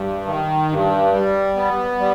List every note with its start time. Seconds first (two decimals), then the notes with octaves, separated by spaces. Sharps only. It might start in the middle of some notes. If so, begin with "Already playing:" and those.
Already playing: G2
0.26 D#3
0.70 G2
1.12 G3
1.55 B3
1.99 G3